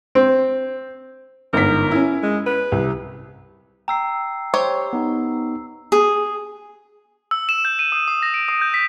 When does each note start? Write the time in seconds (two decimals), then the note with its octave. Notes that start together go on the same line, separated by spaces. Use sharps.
0.15 C4
1.53 G1 G#2 A#4 B6
1.91 C#4 E4
2.23 G#3
2.46 B4
2.72 C2
3.88 G5 A#5 E6 C7
4.54 G4 C5 C#5
4.93 B3 D#4
5.92 G#4
7.31 E6
7.49 E7
7.65 G6
7.79 D#7
7.92 D#6
8.08 D#6
8.23 A#6
8.34 D7
8.49 D#6
8.61 G6
8.74 B6